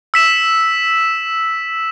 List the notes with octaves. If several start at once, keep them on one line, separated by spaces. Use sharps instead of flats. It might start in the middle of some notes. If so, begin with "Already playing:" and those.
E6 B6 E7